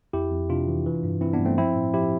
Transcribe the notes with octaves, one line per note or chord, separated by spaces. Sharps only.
F2 E4 G4
F2
C3 D4 F4
E3
E3
G2
E3 C4 E4
B3 D4
G2
A3 C4
F3 C4 E4
A2
F3 E4 G4